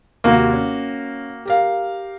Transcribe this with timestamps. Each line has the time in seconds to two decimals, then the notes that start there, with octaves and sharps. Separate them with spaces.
0.24 D#2 C3 A#3 F#4
0.53 C#4
1.45 G4 A#4 F5